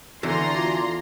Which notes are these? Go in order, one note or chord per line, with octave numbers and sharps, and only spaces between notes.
E2 D3 F#4 D5 G#5 A#5 C6
F4